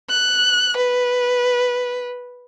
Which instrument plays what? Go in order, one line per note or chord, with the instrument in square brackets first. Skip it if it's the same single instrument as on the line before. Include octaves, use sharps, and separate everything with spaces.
[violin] F#6
B4